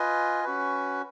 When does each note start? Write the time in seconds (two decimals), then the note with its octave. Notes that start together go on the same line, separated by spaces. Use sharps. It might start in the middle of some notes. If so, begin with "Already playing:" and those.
Already playing: F4 B4 D#5 G#5
0.44 C#4 F#4 B4